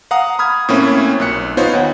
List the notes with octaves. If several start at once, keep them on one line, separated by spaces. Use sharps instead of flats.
F5 F#5 A#5 D#6
B5 D#6 F6 G#6
A2 A#3 C4 C#4 E4
B1 A#2 F#6 C#7
B3 D#4 F4 C5 C#5
D#2 F#5